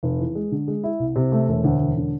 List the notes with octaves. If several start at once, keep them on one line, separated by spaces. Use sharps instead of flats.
F1
E2
G#3
D3
G#3
E4
C2
C3
A3
E1
D2
E1
D3